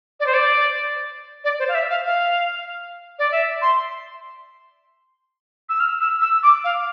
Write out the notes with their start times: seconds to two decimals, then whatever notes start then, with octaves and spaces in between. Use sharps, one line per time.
0.20 D5
0.27 C5
0.34 D5
1.44 D5
1.59 C5
1.68 F5
1.75 E5
1.90 F5
2.06 F5
3.19 D5
3.32 E5
3.62 C6
5.69 E6
5.80 F6
6.01 E6
6.22 E6
6.43 D6
6.64 F5